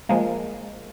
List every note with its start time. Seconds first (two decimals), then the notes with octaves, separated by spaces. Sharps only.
0.09 F3 G#3 A#3